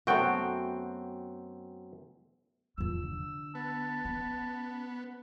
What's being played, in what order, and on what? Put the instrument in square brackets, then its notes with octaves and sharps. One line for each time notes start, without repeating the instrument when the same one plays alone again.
[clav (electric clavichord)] F#2 C4 G5 [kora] A3 B3 F#4
[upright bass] E2 F3 [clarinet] E6
[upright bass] D3
[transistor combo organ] B3 [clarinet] A5
[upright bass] C#4